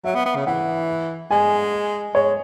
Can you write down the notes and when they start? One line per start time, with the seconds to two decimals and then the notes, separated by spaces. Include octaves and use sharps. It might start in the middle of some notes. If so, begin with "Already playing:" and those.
0.05 F#3 E5
0.15 B3
0.25 B3
0.36 C#3
0.46 E3 F#5
1.31 G#3 G#5
2.14 G#3 C#5